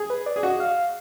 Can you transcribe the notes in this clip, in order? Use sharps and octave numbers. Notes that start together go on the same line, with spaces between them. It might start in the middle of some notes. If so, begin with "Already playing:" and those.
Already playing: G#4
B4
D5
G#4
F#4 D#5
F5
F5